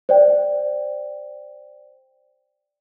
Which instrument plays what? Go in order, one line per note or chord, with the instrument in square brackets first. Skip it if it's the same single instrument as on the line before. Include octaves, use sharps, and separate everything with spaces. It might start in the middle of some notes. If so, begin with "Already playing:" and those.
[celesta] C5 D5 G5